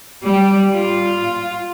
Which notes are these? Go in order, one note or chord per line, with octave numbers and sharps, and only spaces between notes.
G3
F4